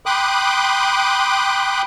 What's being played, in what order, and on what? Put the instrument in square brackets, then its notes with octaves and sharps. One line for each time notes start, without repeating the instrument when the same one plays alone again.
[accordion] G5 B5 C6 D6 D#6 F#6